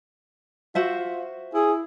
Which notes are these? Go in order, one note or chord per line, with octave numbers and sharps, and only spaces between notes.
F4 F#4 C5 E5
E4 G#4